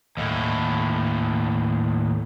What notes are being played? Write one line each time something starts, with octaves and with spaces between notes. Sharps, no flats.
D#2 A2